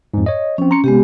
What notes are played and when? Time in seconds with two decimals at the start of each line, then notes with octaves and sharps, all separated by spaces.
0.14 F2 G#2
0.26 C#5 D#5
0.58 F3 C4 C#4
0.71 A#5 C6 C#7
0.84 C3 G#3 B3 G4